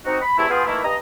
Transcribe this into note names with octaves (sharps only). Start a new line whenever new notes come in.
C4 D#4 F#4
B5
E2 C3 A3 C4 E4
B3 F4 G4 G#4
D#3 E3 A3 A#3 E4
G2 D#5 A#5